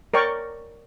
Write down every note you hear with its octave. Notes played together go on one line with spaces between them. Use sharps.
A#4 C#5 D5 G5 C#6